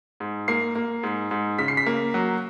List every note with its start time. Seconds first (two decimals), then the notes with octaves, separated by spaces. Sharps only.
0.20 G#2
0.48 A#3 C7
0.75 A#3
1.03 G#2
1.31 G#2
1.59 C#3 B6
1.68 C7
1.77 B6
1.86 A#3
2.14 F#3